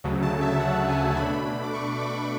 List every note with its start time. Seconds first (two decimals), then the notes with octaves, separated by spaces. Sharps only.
0.04 D2 C#3 F#3 A3
0.23 A5
0.41 E5
0.60 F#5
0.89 G#5
1.17 B2 A3 D4 B5
1.64 D6
1.73 C#6
2.01 D6